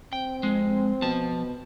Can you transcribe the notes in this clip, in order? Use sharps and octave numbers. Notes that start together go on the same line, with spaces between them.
C4 G5
F2 G#3
B2 F3 A5